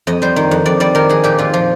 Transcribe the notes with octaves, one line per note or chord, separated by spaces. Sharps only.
F2 D#5
G3 C5
D#3
F2
F2 D5
G3 D5
D#3 A#4
F2 G#4
A#2 G4
A#2 F4
F3